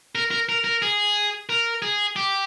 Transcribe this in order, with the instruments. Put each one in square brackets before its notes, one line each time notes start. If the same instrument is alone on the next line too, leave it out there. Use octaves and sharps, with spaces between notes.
[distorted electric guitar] A#4
A#4
A#4
A#4
G#4
A#4
G#4
G4